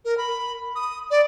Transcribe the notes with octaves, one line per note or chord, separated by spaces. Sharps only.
A#4
B5
D#6
D5